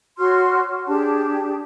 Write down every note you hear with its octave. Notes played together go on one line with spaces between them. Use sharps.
F#4 C#5 C6 F6
D4 G4 G#4 A5